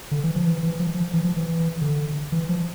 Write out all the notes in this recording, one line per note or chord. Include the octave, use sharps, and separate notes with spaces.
D3
E3
F3
E3
E3
F3
F3
E3
F3
E3
D3
E3
F3